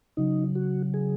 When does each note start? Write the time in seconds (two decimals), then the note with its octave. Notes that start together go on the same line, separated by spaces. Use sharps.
0.17 C#3 F#3 D#4
0.55 F#4
0.94 G#4